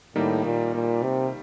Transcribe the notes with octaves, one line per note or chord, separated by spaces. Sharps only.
A2 D#3 G3 A#3 D#4
A#2
A#2
C3